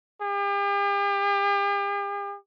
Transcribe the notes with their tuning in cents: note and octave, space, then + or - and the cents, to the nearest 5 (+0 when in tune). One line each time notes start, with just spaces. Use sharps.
G4 +45